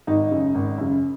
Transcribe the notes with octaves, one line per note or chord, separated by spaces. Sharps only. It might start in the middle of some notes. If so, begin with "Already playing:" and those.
G#1 D#4
F#2 C#3
G#1
F#2 C#3